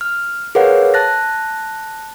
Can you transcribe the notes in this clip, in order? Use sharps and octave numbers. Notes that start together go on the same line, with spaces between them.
F6
G#4 A#4 B4 C#5 F5 F#5
A5 F#6 A6 A#6